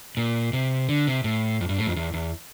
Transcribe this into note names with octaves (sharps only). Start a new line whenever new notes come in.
A#2
C3
D3
C3
A2
F2
G2
A2
F2
E2
E2